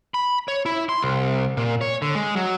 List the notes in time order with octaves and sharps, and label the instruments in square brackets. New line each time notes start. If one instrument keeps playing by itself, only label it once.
[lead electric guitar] B5
C#5
E4
C6
C2
A#2
C#5
D3
G#3
F#3